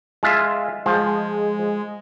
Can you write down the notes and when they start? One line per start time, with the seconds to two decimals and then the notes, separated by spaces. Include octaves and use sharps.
0.23 G#3 F4 E5
0.86 F3 G#3